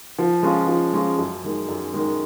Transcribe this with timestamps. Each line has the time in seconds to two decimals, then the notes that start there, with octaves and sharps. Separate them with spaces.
0.19 F3
0.43 G#3 C#4 F4
0.68 F3
0.93 G#3 C#4 F4
1.19 F#2
1.44 D#3 G#3
1.69 F#2
1.94 D#3 G#3